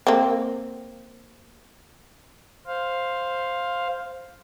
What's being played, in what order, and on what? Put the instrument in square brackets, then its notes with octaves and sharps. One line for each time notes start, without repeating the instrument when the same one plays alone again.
[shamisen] A#3 C4
[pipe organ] C5 F5